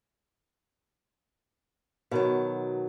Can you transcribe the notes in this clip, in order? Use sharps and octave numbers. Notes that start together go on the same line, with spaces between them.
B2 D#3 F#3